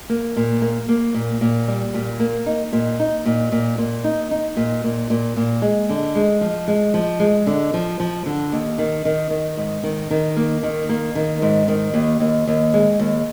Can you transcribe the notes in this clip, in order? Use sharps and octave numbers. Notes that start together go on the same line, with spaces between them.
A#3
A#2
A#3
A#3
A#2
A#2
G3
A#2
A#3
D#4
A#2
D#4
A#2
A#2
A#2
D#4
D#4
A#2
A#2
A#2
A#2
G#3
D3
G#3
F3
G#3
F3
G#3
D3
F3
F3
D3
D#2
D#3
D#3
D#3
G#2
D#3
D#3
A#3
D#3
A#3
D#3
G#2
D#3
D#2
D#2
D#2
G#3
D#2